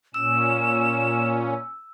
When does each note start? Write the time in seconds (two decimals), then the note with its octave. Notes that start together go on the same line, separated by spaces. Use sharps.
0.14 A#2 C#4 E6 E7